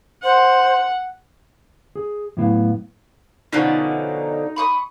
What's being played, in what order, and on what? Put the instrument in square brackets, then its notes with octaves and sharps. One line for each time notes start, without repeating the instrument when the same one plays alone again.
[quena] C5 [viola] F#5
[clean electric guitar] G#4
A2 F#3 B3 E4 F5
[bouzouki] B2 D3 F3 [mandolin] C#4 F#5 [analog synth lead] D#4
[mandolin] B5 C#6 D#6